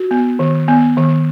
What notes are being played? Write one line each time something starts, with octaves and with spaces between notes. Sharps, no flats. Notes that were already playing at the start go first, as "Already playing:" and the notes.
Already playing: F#4
B3
D#3
B3
D#3